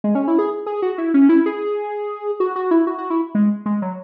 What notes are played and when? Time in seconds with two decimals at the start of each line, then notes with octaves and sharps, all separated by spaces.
0.04 G#3
0.15 C#4
0.28 E4
0.39 G#4
0.66 G#4
0.82 F#4
0.98 E4
1.14 C#4
1.29 E4
1.46 G#4
2.40 F#4
2.56 F#4
2.71 E4
2.87 F#4
2.98 F#4
3.10 E4
3.35 G#3
3.66 G#3
3.82 F#3